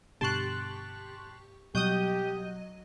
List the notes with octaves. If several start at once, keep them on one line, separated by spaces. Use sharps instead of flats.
G2 B2 D3 G4 A5 C6 C#6 F#6
B2 F#3 G3 G4 D#5 D#6 G6 D#7